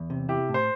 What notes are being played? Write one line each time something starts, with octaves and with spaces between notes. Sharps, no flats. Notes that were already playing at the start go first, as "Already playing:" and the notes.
Already playing: E2
C3
E4 G4
A2
C5